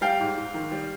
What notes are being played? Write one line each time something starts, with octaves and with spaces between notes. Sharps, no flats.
G3 F5 G5
G#2
G#2
D#3
G3